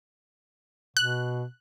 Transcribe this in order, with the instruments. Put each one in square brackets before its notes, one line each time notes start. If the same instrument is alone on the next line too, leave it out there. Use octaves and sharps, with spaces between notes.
[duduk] B2 [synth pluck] F#6